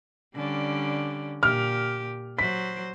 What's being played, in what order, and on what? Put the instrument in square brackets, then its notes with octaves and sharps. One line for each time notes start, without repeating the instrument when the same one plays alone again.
[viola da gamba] D3 G3 C#4
[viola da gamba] A#2 G4 [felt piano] F6
[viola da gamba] F#3 C5 [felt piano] B6